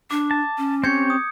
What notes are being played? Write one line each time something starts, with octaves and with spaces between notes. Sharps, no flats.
D4 D6
A5
C#4
C4 G4 C#5 G6 G#6 C#7
D#6